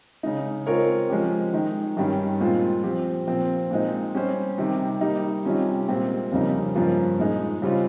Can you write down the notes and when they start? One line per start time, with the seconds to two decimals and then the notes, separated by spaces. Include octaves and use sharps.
0.23 C#3 G#3 D#4
0.66 G#3 C4 F4 A#4 C#5
1.10 F3 G#3 C#4 G4
1.53 D#3 G#3 D#4
1.97 G2 D#3 G3 C#4 G4
2.40 A#2 G#3 C4 F4 C5
2.84 F3 C4 G4
3.27 A#2 F3 C4
3.71 A#2 G#3 C4 D#4
4.15 G3 C#4 G4 C5
4.58 C3 D#3 G3
5.01 G3 A#3 D#4
5.45 C3 D#3 G3 C#4 F4
5.88 A#2 G#3 C4 G4
6.32 F2 C#3 G3 A#3 D#4
6.75 G2 F3 A#3 C#4
7.19 A#2 G#3 D#4 G#4
7.62 C#3 G3 C4 F4